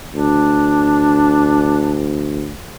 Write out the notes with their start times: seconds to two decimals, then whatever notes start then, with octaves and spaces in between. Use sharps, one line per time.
0.15 D2 D4